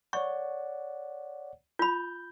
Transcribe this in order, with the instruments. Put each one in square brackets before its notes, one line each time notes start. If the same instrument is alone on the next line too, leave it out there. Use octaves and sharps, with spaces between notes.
[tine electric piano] C#5 D5 F#5 [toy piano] C#6
[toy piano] F4 B5 [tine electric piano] G6